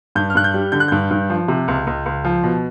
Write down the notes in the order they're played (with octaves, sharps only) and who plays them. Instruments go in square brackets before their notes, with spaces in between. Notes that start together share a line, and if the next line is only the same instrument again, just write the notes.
[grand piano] G2 G6
F6
G2 F#6
G6
G3
D3 G6
F#6
G2 G6
G2
F3
C3
C#2
C#2
C#2
F3
B2